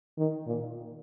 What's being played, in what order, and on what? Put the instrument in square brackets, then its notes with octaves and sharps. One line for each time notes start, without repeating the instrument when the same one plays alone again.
[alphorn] D#3
A#2